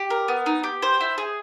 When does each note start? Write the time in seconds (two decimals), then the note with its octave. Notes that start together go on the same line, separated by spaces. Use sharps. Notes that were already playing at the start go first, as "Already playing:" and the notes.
Already playing: G4
0.10 A#4
0.28 B3
0.46 D#4
0.63 G4
0.82 C5
1.01 E4
1.18 G#4